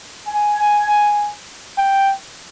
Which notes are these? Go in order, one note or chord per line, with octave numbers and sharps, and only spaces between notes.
G#5
G5